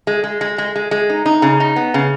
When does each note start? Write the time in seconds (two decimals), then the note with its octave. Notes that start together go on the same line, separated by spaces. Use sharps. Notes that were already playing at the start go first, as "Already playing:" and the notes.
0.07 G#3
0.24 G#3
0.41 G#3
0.58 G#3
0.76 G#3
0.91 G#3
1.09 D#4
1.26 D#4
1.42 C#3
1.60 D#4
1.76 B3
1.94 C#3